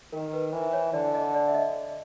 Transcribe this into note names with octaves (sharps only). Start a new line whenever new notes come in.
D#3 A#4
B4
E3 C5
C#5
D3 D5
D#5
D5
E5
D#5